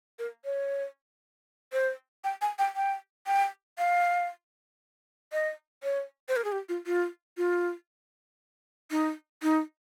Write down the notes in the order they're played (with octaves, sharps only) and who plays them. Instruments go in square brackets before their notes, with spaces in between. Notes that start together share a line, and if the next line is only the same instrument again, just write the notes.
[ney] A#4
C#5
C5
G5
G#5
G5
G5
G5
F5
D#5
C#5
C5
A#4
G#4
G4
F4
F4
F4
D#4
D#4